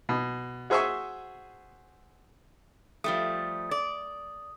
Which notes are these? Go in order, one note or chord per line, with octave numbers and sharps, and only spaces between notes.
B2
F#4 G#4 C5 E5 G#5 C#6
F3 G3 A3 D#6
D5